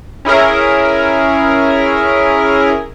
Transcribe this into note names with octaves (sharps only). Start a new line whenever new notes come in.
C#4 E4 G#4 A#4